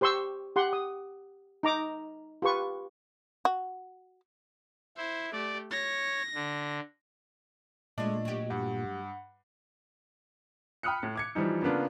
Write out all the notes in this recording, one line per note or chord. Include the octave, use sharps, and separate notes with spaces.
G4 C5 C6 C#6 E6
G4 F#5 C6
D#6
D#4 A#5 D6
F4 G4 B4 C#6
F#4
E4 C5
A3 G4 D5
C#5 A#6
D3
A#2 G#3 A3 D4 D#5
F#3 G4
G2 F#5
G5 B5 D#6 F6 F#6 C#7
A2
D6 G#6 C#7
E3 F3 G3 D#4
C#3 A#3 B3 D4 F4